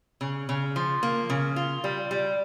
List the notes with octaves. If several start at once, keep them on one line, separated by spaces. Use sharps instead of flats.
C#3
C#3
F3
A#3
C#3
F4
G3
G3